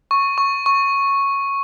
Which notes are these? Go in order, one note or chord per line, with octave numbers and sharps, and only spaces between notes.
C#6
C#6
C#6